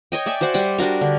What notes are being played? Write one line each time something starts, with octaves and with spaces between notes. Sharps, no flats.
C#5 D#5 G5
D5 E5 G5 G#5
F#4 C5 D5 F#5
G3 F#5 G5
G3 D4 F#4 A#4
D3